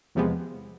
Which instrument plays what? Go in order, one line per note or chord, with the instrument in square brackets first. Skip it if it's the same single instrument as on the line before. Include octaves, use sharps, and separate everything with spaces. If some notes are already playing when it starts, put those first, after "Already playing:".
[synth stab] E2 C3 F3 G#3 B3